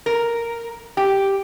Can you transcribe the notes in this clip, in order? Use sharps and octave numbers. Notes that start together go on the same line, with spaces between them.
A#4
G4